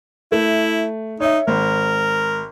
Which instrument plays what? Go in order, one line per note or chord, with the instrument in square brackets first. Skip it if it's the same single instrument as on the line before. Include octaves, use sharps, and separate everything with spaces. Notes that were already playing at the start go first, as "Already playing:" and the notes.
[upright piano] A3 [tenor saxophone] E4
[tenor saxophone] D#4 [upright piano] C#5 E5
[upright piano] G#1 [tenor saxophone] A#4